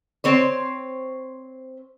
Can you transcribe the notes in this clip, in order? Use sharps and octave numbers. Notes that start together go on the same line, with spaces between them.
C4 C5 C#5